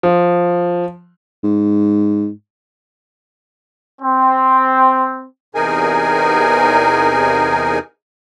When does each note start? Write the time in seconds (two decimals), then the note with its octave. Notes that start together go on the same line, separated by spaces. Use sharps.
0.03 F3
1.44 G#2
4.02 C4
5.55 E2 C3 D#4 G#4 A#4 G#5